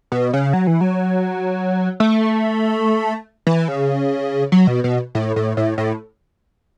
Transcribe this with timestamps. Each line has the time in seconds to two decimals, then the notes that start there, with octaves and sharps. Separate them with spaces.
0.12 B2
0.33 C#3
0.53 F#3
0.67 E3
0.81 F#3
2.00 A3
3.47 E3
3.68 C#3
4.52 F#3
4.67 B2
4.84 B2
5.15 A2
5.36 A2
5.57 A2
5.78 A2